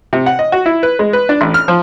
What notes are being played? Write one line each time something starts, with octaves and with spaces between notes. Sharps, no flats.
C3
F#5
D#5
F#4
E4
B4
G#3
B4
D4
A1
F6
F3